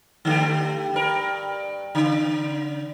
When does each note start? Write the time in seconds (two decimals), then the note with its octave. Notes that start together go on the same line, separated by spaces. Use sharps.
0.25 D3 A3 G4
0.94 G2 A#4
1.95 C#3